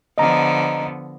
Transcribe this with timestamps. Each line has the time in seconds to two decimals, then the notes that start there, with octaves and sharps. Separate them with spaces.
0.18 D3 F3 B3 D#5 A#5